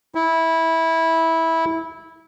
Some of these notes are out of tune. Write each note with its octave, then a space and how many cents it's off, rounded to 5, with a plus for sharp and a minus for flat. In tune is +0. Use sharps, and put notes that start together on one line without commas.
E4 -15